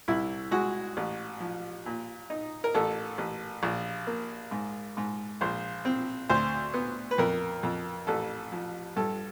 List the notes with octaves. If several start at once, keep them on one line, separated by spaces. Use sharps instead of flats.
C2 E4
G#3 F#4
A1
F3
A#2
D#4
A#4
A1 A4
A1
A#1
A#3
G#2
G#2
A#1 C5
C4
D2 C5
B3
B4
F2 A#4
F2
A1 A4
F3
G2 A4